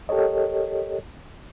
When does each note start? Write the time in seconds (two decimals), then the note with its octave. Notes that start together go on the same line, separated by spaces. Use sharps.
0.09 G4 A4 A#4 C#5 D#5